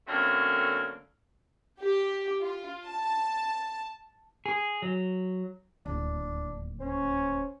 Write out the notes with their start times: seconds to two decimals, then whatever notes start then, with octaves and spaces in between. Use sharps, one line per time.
0.07 D3 F#3 A3 A#3 C4 C#4
1.80 G4
2.42 F4
2.86 A5
4.46 G#4
4.82 F#3
5.86 D1 D#2 D4
6.80 C#4 C5